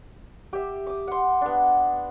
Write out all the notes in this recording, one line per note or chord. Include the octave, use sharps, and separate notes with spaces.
G4 E5
D6 D#6
F#5 C6
B3 D4